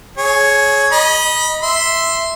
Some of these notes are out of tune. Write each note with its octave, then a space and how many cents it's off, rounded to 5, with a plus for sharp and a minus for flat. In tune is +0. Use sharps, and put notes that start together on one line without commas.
G#4 +30 C#5 +0
D#5 +0 B5 -30
E5 +0 C6 -10